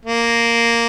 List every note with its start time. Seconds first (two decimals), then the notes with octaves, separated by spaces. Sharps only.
0.05 A#3